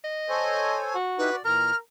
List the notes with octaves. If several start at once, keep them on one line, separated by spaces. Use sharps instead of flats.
D#5
A4 C5 C#5 G#5
F#4
D#4 E4 G4 B4
D5
A#2 E3 A#4 F6